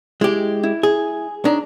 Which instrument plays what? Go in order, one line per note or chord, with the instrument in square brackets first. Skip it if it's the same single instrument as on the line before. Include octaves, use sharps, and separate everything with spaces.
[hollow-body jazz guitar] G#3 G4 [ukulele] E4
[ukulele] E4
[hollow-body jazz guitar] G#4
[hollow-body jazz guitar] D4 [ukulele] D#4 C#5 A#5